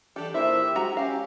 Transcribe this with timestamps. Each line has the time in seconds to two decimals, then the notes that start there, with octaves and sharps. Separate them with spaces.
0.16 E3 D4 G4 A4
0.34 A#2 A#3 E4 C5 E5
0.62 G4
0.75 G#3 F#4 A#5
0.97 C#4 G4 F5